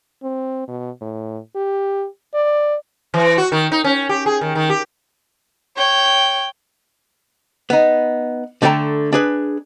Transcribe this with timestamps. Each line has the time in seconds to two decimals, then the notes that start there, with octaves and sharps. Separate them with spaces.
0.23 C4
0.68 B2
1.01 A2
1.55 G4
2.34 D5
3.14 E3
3.38 F#4
3.52 D#3
3.72 D#4
3.84 C#4
4.09 G4
4.26 G#4
4.41 D#3
4.55 D#3
4.70 G4
5.78 C#5 G5
7.70 B3 D#4
8.62 D3 A3 A4 B4 G5 A#5
9.12 D4 G#4 B4